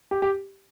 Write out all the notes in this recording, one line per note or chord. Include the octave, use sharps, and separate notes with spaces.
G4
G4